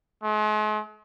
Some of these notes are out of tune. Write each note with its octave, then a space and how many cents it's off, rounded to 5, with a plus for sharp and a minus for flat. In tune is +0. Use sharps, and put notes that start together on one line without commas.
G#3 +45